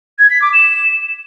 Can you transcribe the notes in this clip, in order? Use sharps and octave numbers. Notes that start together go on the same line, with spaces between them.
G#6
B6
D6
E7